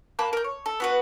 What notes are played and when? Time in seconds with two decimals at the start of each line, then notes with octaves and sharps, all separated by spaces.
0.19 A#3 A5 B5 F#6
0.33 A#4 G6
0.44 C#5
0.66 A4
0.80 B3 F#4 B4